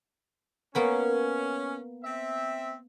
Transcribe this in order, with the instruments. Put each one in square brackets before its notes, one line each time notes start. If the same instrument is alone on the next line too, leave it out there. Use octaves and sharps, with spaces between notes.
[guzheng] A#3 B3 B4 [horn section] C#4
[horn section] C4 E5